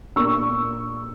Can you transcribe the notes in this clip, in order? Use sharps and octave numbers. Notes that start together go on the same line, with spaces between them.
A#2 A#3 D4 C#6 E6